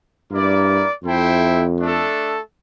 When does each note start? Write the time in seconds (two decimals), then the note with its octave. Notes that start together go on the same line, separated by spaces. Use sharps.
0.31 G2 A#3 E4 A#4 D5
1.04 F2 E4 A4 C5 E5 G5
1.79 A3 D4 A4